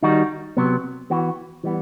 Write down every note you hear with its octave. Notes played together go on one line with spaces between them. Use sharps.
D#3 G3 D#4 F#4
C3 F#3 B3
E3 B3 F#4
E3 G3 B3